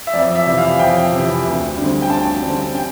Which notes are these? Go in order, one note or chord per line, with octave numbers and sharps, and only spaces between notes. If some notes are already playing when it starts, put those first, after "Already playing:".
E5
F2 D5
E5
C3 E3
F5
F2 G5
C3 E3
D2
D3 G3 C4
G5
D2 A5
D3 G3 C4
G5